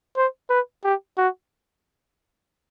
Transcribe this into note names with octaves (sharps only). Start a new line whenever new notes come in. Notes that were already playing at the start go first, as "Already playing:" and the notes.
C5
B4
G4
F#4